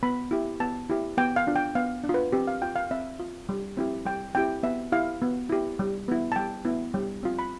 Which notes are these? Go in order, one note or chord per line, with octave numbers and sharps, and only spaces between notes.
B3 B5
E4 G4
B3 A5
E4 G4
B3 G5
F5
D4 F4
G5
B3 F5
D4
F4
B4
C4 G4
F5
F4 G5
F5
C4 E5
F4
G3
C4 E4 G4
G3 G5
C4 E4 G4 G5
B3 E5
E4 G4 F5
B3
E4 G4
G3
B3 E4
A5
G3 G5
B3 E4
G3
C4 F4
B5